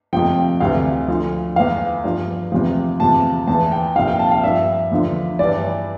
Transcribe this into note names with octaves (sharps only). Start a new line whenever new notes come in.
F2 C3 F3 G5
D2 C3 E3 F5
D2 D3 F3
E2 E3 F5
G2 F3
E2 C3 F3
E2 C3 F3 A5
E2 E3 A5
G5
C2 A#2 F3 F5
G5
A5
F5
G2 F3 E5
E2 D3 F3
G2 E3 D5